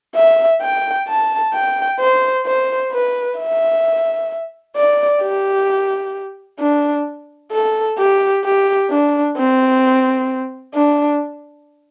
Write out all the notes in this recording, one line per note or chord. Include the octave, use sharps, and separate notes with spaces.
E5
G5
A5
G5
C5
C5
B4
E5
D5
G4
D4
A4
G4
G4
D4
C4
D4